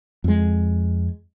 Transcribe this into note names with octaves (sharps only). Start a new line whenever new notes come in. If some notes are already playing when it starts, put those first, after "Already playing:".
F2 G#3